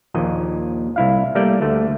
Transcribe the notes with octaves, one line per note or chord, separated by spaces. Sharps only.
A#1 D#2 A#2 D#5
C2 E4 F5
G3 A3 A#3 G4 D5 G5
D2 A3